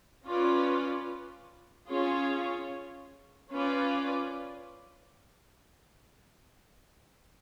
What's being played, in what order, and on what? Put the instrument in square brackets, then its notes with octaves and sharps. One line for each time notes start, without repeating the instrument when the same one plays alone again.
[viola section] C#4 F4 B4 D5
C#4 F4 G#4 C#5
C#4 F4 B4 D5